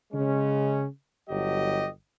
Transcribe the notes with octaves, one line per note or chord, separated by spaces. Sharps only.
C#3 G#3 C#4
G1 F#3 G4 D#5